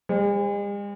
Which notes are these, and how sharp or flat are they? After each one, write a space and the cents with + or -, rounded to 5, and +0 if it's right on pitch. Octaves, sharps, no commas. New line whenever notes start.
G#3 -45 C5 +10